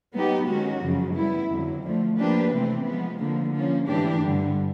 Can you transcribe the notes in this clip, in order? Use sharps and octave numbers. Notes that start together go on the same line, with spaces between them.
F#3 B3 D#4 G4
D#3 G#3 C#4 F#4
F#2 C#3 F3
G3 B3 E4
F2 D3 F#3
D3 F3 A3
F3 A#3 D4 G4 B4
C3 E3 A3 C4
F3 G#3 B3
D3 F3 A#3
F3 A#3 C#4
G#2 E3 A3 D4 G4
G2 D3 G3